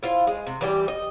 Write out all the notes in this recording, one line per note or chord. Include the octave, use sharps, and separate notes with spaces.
E4 F4 C5
G#3
C3
E3 G3 G4
D#5